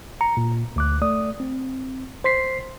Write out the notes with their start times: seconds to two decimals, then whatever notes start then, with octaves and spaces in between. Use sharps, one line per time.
0.21 A#5 C#7
0.37 A#2
0.76 D2 D6 F#6
1.02 A3 D5 D#6
1.40 C4
2.24 C5 C6 B6 C7